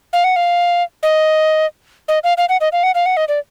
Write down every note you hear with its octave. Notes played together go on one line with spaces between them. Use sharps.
F5
F#5
F5
D#5
D#5
F5
F5
F#5
D#5
F5
F#5
F5
F#5
D#5
D5